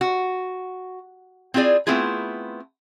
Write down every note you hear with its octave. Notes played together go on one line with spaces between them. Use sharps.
F#4
C4 E4 F4 G#4 D5
A3 B3 C4 E4 F4 G#4